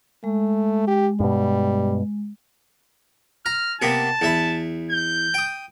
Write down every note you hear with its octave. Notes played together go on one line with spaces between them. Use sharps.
G#3 A3
G4
G2 B2 G3
A#5 F6
C3 A#3 B3 A5
E2 E5 B5
G6
G5 D#6